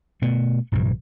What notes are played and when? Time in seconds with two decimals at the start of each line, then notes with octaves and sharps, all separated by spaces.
0.22 B2 A3 B3
0.72 A#1 G2 C3 E3